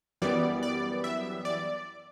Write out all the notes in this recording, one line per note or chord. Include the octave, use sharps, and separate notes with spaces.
F#2 E3 G3 B3 D5
D5
E5
D5